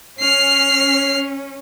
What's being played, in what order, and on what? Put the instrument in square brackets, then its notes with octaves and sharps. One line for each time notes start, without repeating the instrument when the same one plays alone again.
[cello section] C#4 [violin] F6 C7